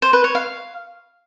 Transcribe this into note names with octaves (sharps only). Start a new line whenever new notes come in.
C5
B4
C#5
F5